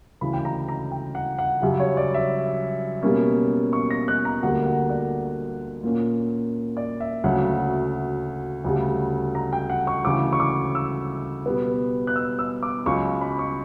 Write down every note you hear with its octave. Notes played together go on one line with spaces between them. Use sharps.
D2 C#3 E3 B5
G5
A#5
A#5
G5
F#5
F#5
F#2 C#3 G3 E5
C#5
D5
E5
B2 G3 A#3 C#4
C#6
A#6
F#6
A#5
D2 D3 G3 A#3 F#5
F#5
D5
A#2 A#3 C#4
D5
E5
D2 C#3 F#3 C#4 F#5
D2 C#3 G3
A#5
G5
F#5
C#6
D2 C#3 E3 D6
C#6
D6
E6
B2 G3 B3
F#6
E6
E6
D6
C#2 C#3 F#3 C#6
B5
C#6